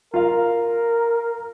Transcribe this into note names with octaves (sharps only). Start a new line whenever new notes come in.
F4 A#4 F5